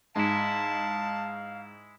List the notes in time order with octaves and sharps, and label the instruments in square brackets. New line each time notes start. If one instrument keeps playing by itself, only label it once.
[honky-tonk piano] G#2 [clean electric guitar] G#3 E4 [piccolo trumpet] F5 [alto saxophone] A5